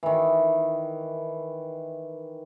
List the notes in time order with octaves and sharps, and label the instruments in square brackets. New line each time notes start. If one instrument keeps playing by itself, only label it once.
[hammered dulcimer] D#3 E3